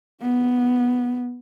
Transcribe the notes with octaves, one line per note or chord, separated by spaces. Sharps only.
B3